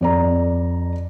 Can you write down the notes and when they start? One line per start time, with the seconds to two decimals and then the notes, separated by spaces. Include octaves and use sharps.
0.01 F2 D5 A#5